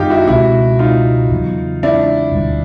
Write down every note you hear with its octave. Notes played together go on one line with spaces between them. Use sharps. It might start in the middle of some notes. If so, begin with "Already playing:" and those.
Already playing: F#2 D#3 D#4 F4 G4
E4 F#4
C#2 B2 G#3 C4 E4 F#4
D#4 F4
E2 C#3 F#3 B3
D4 E4
E1 D2 D3 G3